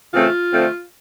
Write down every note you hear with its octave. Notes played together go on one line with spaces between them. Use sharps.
C#3 E3 A3 C4 F4
D3 F3 A3 C4